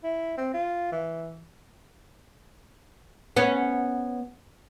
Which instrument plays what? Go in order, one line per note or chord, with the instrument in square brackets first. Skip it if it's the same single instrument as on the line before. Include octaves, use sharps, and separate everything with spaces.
[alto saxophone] E4
C4
F4
E3
[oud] B3 C#4